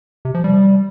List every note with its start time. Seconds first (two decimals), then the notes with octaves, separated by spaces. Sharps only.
0.25 C3
0.34 F3
0.44 G3